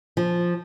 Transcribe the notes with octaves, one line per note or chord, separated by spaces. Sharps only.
F3